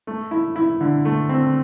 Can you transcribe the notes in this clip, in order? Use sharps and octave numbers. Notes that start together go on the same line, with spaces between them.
A3
E4
E4
D3
A3
C4